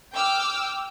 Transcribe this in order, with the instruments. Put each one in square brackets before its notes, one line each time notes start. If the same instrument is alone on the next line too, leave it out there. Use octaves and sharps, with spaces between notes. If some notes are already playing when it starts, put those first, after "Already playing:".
[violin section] G5 D6 E6 F6